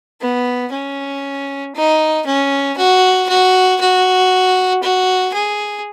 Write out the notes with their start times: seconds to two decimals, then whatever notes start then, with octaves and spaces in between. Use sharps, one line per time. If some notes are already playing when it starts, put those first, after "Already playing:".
0.21 B3
0.72 C#4
1.75 D#4
2.26 C#4
2.77 F#4
3.29 F#4
3.80 F#4
4.83 F#4
5.34 G#4